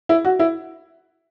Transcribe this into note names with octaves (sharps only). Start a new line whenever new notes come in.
E4
F#4
E4